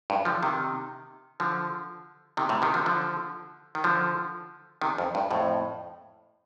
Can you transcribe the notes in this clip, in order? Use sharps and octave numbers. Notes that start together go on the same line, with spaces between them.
G2
D3 F3
C3 D#3
D3 F3
C3 D#3
A2 C3
C3 D#3
D3 F3
D3 F3
D#3
D3 F3
C3 D#3
F2
G2
F2 A2